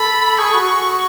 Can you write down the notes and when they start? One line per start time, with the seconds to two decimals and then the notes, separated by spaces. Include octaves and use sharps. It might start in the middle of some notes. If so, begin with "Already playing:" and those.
Already playing: A4 B5
0.39 G#4 C#6
0.53 F#4